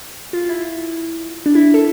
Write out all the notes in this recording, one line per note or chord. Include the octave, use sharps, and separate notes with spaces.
F4
E4
D4
E4
A4